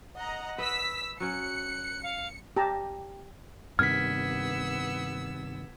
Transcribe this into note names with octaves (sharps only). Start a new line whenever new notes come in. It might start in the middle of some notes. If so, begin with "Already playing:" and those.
D#5 F#5 A#5
B4 D#5 E6 B6
F#3 C#4 F#6 C#7
F5
G4 A5 A#5
G2 C3 D#3 B3 E6 F6 G#6 B6